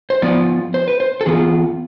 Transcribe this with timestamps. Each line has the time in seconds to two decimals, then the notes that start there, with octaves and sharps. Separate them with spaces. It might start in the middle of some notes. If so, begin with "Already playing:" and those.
0.10 C5
0.22 F3 B3 F4 D5
0.74 C5
0.88 B4
1.00 C5
1.21 A4
1.26 E3 B3 F4 G#4